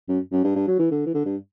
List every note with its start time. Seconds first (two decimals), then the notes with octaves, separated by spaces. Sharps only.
0.08 F#2
0.32 F#2
0.44 G2
0.56 G2
0.67 F#3
0.79 E3
0.91 D3
1.06 E3
1.14 D3
1.25 G2